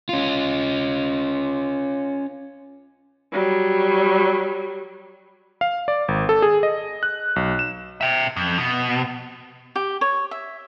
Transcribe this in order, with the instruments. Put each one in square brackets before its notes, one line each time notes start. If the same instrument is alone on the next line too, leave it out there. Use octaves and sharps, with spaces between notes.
[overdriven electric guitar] C#4 F4
[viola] F#3 G3
[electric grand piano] F5
D5
G#1
A4
G#4
D#5
F#6
B1
E7
[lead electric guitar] E5 G5
F2
B2
[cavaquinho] G4
C#5
E5